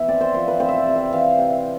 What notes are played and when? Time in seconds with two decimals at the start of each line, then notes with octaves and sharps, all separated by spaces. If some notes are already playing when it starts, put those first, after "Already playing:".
Already playing: E3 B3 E5
0.08 C4 D5
0.21 C5
0.34 F3 C5
0.48 B4
0.60 C4 C5
0.69 E5
0.78 D5
0.87 C3
0.95 E5
1.11 E3 F5
1.38 C3